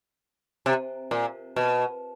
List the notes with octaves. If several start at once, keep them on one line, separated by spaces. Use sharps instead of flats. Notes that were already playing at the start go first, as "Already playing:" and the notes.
C3
A#2
B2